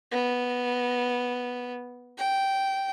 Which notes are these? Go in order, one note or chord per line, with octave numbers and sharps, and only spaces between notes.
B3
G5